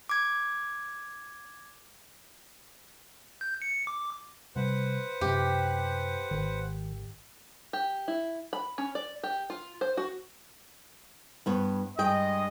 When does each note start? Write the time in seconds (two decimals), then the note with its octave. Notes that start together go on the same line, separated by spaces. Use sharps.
0.09 D6 G#6
3.41 G6
3.62 C#7
3.87 D6
4.56 C3 G3 B4 C5 F#5
5.21 F#2 C3 G4
6.31 G#1 D#3
7.73 G4
8.08 E4
8.53 B5
8.78 C#4
8.95 D5
9.24 G4
9.50 F4
9.81 C5
9.97 F#4
11.46 G2 B3 C#5
11.98 G2 G#3 G#4 D#5 G5